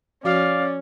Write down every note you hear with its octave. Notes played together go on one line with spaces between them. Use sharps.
F3 C#4 F#4 D5 F5